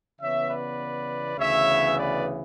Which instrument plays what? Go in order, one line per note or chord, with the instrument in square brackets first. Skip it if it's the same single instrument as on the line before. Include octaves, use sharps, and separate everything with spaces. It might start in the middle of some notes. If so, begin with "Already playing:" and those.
[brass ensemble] C#3 E3 B3 C#5 E5
B4 D5
D2 C#3 E3 B3 C#5 E5
B4 D5